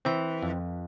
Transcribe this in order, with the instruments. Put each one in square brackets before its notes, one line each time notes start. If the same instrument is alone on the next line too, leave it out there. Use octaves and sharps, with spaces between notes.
[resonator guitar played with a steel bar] E3 [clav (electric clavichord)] C4
[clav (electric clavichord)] F2